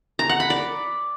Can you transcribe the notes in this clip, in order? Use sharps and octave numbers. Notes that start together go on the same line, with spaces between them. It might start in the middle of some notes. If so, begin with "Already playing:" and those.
A#5
F#5
B5
D5